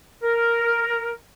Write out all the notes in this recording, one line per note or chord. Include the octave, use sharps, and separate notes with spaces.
A#4